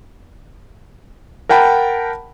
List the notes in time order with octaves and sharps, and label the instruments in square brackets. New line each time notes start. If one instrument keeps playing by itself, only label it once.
[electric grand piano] A#4 F#5 G5 A5 B5